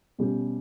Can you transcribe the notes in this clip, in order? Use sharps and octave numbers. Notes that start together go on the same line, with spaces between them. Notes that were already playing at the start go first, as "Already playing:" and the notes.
B2 G3 C#4 G4